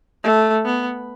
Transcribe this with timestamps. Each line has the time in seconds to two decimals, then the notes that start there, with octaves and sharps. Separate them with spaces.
0.23 A3
0.65 B3